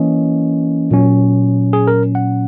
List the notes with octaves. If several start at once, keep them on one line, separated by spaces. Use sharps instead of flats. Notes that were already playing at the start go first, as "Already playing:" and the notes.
Already playing: E3 A#3 C#4 D#5
A#2 F#3 C#4
G#4
A#4
F#5